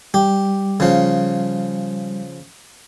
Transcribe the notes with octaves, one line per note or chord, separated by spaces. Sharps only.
G3 G4
C#3 F3